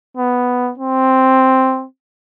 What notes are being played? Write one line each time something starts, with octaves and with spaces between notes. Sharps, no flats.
B3
C4